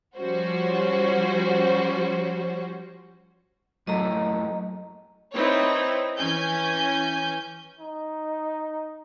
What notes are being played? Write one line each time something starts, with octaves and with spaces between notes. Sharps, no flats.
F3 G3 C#4 F#4 C5
F#2 A2 F#3 A3 D#5 A#5
C4 D#4 E4 B4 C#5
E3 C#4 G#5 G6
D#4